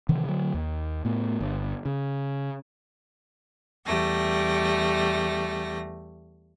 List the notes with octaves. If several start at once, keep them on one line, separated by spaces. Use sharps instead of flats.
C3 D#3 E3
D3 F#3
D#2
A2 B3
G1
C#3
E2 G3 A3 A#6